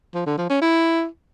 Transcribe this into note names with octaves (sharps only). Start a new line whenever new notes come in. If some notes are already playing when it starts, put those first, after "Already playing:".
F3
D3
F3
C#4
E4